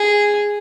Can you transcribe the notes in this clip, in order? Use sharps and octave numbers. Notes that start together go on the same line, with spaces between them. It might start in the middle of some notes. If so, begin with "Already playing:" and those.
Already playing: G#4